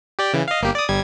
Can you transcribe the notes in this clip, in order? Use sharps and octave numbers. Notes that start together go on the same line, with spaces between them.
G4 D5 G5
C#3 E3
D#5 F5
G1 A#3 G4
D5 D#6
G1 G3 G#6